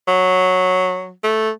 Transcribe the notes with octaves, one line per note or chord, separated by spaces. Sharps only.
F#3
A3